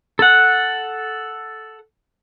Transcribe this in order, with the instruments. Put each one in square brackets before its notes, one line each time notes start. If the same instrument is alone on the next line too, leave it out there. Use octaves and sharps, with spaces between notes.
[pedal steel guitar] A4 F#5